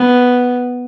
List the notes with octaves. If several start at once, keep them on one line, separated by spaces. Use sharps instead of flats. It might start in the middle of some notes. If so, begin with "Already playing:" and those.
Already playing: B3